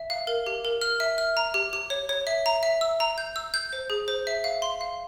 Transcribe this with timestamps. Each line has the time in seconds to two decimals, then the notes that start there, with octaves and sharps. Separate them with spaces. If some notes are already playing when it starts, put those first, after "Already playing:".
Already playing: E5
0.10 F5
0.27 A#4
0.46 G4
0.65 A#4
0.81 F6
1.00 E5
1.18 F6
1.37 A#5
1.54 G4
1.73 G4
1.90 C#5
2.09 C#5
2.27 E5
2.46 A#5
2.63 E5
2.81 E6
3.00 A#5
3.18 G6
3.36 E6
3.54 G6
3.73 C5
3.90 G#4
4.08 C5
4.27 E5
4.44 F5
4.62 C6
4.81 F5